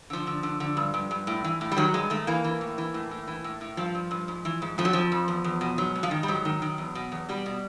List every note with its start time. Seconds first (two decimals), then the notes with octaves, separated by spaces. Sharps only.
0.10 D3 F3
0.27 D3
0.43 D3
0.60 D3
0.77 G2
0.94 G2
1.11 G2
1.27 A2
1.44 E3
1.61 A2
1.72 G3
1.77 D#3 F#3
1.94 G2 G#3
2.10 D#3 A3
2.27 E3 A#3
2.44 E3
2.61 A2
2.78 E3
2.94 A2
3.11 A2
3.27 E3
3.44 A2
3.61 A2
3.77 G2 F3
3.95 G2
4.11 G2
4.28 G#2
4.45 E3
4.62 G#2
4.78 F2 F3
4.85 F#3
4.93 F2 F3
5.12 F2
5.28 E2
5.44 E2
5.61 B2
5.78 G#2 F#3
5.95 G#2
6.03 F3
6.11 D#3
6.23 G3
6.28 G#2 F#3
6.45 D#3
6.62 D#3
6.78 E2
6.95 B2
7.12 E2
7.29 B2 G3
7.46 B2